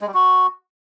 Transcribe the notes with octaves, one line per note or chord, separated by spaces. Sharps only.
G#3
G3
F#4